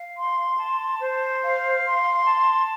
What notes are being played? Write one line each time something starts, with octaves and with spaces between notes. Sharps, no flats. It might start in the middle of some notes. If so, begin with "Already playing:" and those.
Already playing: F5
C6
A5
C5
F5
C6
A5